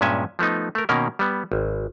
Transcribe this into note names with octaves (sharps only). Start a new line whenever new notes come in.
G2 A#2 G#3 C#4 E5 G#5
F3 A3 B3 D#4
A3 A#4
B2 D#3 A#3 C#4 A#4
G3 B3
G#1